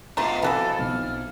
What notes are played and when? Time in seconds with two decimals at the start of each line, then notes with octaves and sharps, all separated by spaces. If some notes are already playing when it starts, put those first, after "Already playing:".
0.17 D1 B2 A3 A#3 F4 F5 A#5 C6
0.42 F2 B2 E3 F#4 A4 B4
0.79 B1 F6